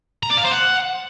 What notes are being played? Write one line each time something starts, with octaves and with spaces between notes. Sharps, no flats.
A#5
D5
F5
C5
F#5